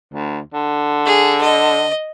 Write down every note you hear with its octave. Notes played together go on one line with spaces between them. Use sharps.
D2
D3
G#4
D#5